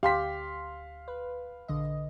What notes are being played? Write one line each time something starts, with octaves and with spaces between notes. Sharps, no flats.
D2 G4 F5 C6 B6
B4
A#1 D3 D#5